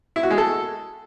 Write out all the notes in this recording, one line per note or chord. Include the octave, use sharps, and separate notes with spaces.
E4
F#4
G#3
A4